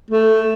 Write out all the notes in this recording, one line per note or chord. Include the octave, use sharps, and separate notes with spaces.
A3